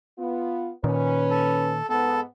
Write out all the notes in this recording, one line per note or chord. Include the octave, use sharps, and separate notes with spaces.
B3 F4
A#2 D#3 C#4 B4
A4
G#2 B3 A4